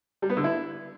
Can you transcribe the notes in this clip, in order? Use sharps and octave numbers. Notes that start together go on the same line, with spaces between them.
G3
B3
D3
E4